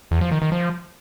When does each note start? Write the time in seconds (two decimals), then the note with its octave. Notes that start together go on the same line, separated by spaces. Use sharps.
0.11 E2
0.21 F3
0.32 D#3
0.42 D#3
0.52 F3